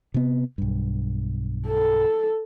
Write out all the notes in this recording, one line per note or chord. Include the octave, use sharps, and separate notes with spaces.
C3 B3
B1 G2
A4